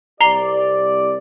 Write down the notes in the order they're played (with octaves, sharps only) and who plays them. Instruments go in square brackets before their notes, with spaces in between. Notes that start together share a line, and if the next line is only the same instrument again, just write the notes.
[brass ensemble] C2 G4 D5 [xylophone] A#5 C7 G7